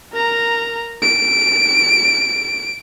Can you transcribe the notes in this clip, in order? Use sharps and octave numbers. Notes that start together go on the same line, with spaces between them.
A#4 A#5
D7